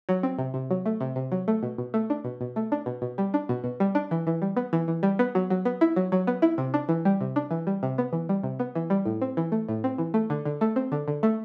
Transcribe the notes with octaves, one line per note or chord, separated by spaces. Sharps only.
F#3
C4
C3
C3
F#3
A3
C3
C3
F#3
A3
B2
B2
A3
D4
B2
B2
A3
D4
B2
B2
G3
D4
B2
B2
G3
D4
E3
E3
G3
B3
E3
E3
G3
B3
F#3
F#3
B3
E4
F#3
F#3
B3
E4
C3
D4
E3
G3
C3
D4
E3
G3
C3
B3
E3
G3
C3
B3
E3
G3
A2
C4
E3
A3
A2
C4
E3
A3
D3
D3
A3
C4
D3
D3
A3